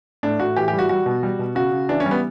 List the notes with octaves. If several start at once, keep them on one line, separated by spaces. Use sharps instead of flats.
A2 D4
A2 F#4
E3 G4
G4
G3
F#4
G3 F#4
B2
G3
B2
C#3 F#4
C#3
E3 D4
C#4
G3
B3